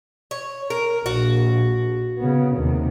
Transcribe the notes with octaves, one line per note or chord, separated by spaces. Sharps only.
C#5
A#4
A#1 F#4
C#3 B3
D#2 C3